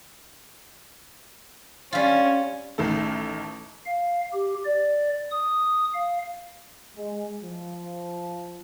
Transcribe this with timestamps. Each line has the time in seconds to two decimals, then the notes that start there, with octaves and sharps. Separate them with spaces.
1.92 G3 C#4 F4
2.78 A1 D#3 A3 A4
3.85 F5
4.33 G4
4.65 D5
5.31 D#6
5.94 F5
6.97 G#3
7.44 F3